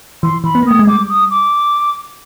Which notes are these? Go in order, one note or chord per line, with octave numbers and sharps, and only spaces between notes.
E3 C6
E3 B5
B3
A#3
A3 D#6
G#3
G3 D6
D#6
D6